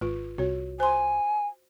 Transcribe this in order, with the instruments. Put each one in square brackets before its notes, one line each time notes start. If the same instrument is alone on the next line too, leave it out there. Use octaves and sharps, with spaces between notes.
[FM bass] G#1 [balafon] F4 B4
[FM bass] C2 [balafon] F#4 C#5
[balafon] C5 C6 [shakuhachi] G#5